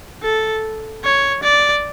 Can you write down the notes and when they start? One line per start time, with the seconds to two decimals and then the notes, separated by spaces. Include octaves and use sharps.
0.23 A4
1.04 C#5
1.43 D5